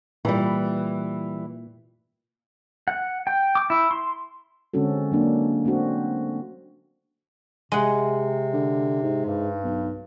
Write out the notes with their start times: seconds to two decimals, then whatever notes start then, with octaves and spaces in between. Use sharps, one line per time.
0.25 A#2 E3 G3
2.88 F#5
3.27 G5
3.55 D6
3.70 E4
3.91 C6
4.74 D3 G#3 C4 C#4 F#4 A4
5.12 F#3 A#3 D4
5.65 A3 C4 D4 F#4
7.72 C3 G#3 F#5
8.53 D3
9.03 G#2
9.25 G2
9.63 B1